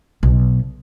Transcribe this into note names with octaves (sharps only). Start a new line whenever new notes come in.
B1